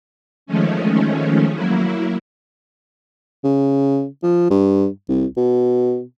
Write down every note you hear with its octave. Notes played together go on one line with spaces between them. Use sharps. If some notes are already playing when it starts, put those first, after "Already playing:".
D#3 F3 G#3 A3 C#4
F#3 A#3 E4
C#3
F3
G2
C2
B2